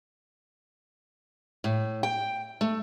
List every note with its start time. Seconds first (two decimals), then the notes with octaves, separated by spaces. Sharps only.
1.64 A2
2.03 G5
2.61 A3